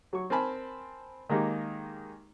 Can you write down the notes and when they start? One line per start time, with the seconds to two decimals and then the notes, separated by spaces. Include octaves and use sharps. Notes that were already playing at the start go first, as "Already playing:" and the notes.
0.13 F#3 C#6
0.30 C4 A#4 G#5 A5 B5
1.29 D#3 G#3 A#3 D#4 G4